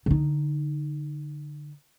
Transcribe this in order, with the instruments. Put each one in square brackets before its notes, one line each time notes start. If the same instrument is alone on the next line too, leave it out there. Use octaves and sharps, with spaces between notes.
[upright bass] D3 D#4